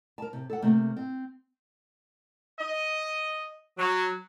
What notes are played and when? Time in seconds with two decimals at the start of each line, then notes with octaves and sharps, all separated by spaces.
0.18 A#4 A5
0.33 C3
0.50 A4 F#5
0.62 C3 A3 A#3
0.97 C4
2.59 D#5
3.77 F#3